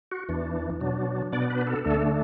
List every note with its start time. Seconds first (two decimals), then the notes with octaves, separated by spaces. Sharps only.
0.11 F#4
0.29 E2 E3 D4
0.80 B2 F#3 D4
1.33 B2 B3 D4 D5
1.50 B4
1.67 A4
1.84 D2 D3 A3 D4 A4